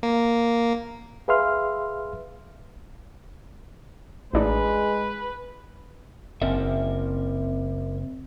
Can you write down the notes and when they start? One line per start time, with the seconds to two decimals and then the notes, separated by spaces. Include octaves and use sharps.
0.03 A#3
1.28 G#4 B4 E5 F5 C6 F6
4.33 A1 G#3 D4 D#4 B4
6.42 F#1 C4 A#4 E5